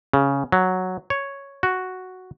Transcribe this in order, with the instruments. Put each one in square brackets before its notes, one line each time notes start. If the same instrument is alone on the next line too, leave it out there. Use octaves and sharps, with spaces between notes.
[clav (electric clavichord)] C#3
F#3
C#5
F#4